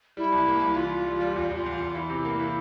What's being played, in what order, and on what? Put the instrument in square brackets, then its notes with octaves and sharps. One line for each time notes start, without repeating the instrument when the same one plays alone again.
[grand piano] G3 [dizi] E4
[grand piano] C2
A#3
C2
[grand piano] E3 [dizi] F4
[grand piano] E3
G3
G3
[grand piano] E2 [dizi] F4
[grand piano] E2 [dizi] F4
[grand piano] E2
[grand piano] E2 [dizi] F4
[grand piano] E3 [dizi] E4
[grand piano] C3
A#3
E3